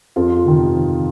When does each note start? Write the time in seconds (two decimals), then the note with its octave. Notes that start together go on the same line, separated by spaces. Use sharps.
0.16 F2 F4
0.44 C3 D#3